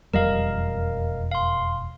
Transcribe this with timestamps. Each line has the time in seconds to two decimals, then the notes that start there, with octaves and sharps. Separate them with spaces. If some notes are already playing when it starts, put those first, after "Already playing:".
0.14 E1 F2 G3 A#4 D#5 F5
1.31 F5 C6